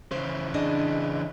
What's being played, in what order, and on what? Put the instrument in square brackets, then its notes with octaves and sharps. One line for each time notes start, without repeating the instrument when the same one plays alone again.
[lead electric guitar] C#3 E3 [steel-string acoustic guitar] C5
[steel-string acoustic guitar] D4 G#4 D#5